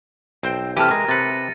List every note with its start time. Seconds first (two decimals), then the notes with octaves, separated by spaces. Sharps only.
0.43 B1 C4 C5 G5
0.77 C3 E3 G4 A4 F6 D#7
0.91 G#3 A#4 A#6
1.09 C3 B4 A6 C#7